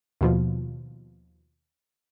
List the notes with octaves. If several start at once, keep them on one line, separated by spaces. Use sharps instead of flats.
D#2 B2 F3